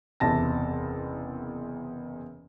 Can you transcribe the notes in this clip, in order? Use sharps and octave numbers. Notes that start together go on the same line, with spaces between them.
F#1 E2 C3 A5 A#6